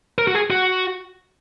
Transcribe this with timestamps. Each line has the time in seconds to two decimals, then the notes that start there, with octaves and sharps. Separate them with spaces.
0.18 A#4
0.27 F#4
0.35 G#4
0.50 F#4